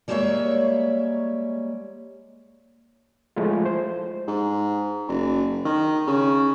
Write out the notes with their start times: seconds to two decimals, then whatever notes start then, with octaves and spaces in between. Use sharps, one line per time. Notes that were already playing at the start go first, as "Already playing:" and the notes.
0.08 G3 G#3 A#3 A#4 C#5 E5
3.36 F3 G#3 A3 E4 F4
3.66 C5
4.27 G#2
5.08 F#1
5.65 D#3
6.07 C#3